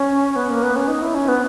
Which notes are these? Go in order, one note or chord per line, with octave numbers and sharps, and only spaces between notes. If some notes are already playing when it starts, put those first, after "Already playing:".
Already playing: C#4
B3
A#3
B3
C#4
D#4
E4
C#4
B3